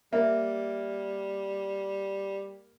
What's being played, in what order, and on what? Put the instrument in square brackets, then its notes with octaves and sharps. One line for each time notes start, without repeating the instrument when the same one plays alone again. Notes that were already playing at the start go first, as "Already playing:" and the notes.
[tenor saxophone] G3 [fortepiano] A#3 [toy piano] E5